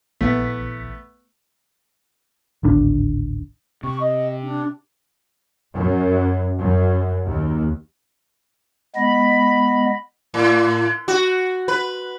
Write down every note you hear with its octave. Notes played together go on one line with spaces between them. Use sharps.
A#1 E3 A3 B3 B6
D1 G#1 D3 D4
C3 C#6
D#5
D4
F#2
F#2
D#2
G#3 B3 D#5 B5
A2
F#4
B4